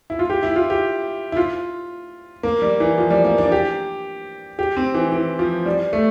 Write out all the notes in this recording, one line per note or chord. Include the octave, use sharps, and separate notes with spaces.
E4
F4
G4
E4
F4
G4
E4
F4
A#3
G3
E3
F3
G3
A#3
D4
G4
G4
C4
E3
E3
F3
G3
A3